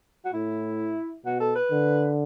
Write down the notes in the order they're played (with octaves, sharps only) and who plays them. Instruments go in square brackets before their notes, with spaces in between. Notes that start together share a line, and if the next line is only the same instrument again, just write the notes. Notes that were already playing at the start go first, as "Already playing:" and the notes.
[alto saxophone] F#4
[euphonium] A2 [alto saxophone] E4
[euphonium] B2 [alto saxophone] F#4
[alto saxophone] A4
B4
[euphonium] D3